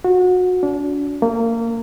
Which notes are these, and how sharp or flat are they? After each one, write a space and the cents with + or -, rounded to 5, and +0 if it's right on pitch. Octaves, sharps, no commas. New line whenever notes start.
F#4 -25
D4 -35
A#3 -25